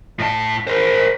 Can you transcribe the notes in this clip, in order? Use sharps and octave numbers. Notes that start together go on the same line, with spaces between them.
A2 A5
A#4 C5